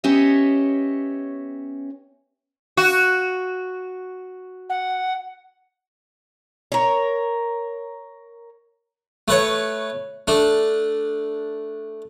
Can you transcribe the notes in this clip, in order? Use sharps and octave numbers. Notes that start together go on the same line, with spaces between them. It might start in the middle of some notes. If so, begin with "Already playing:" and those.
B3 C#4 G4 C#5 D#5 E5
F#4
F#5
A#4 C#5
A3 B4 C#5
A3 D4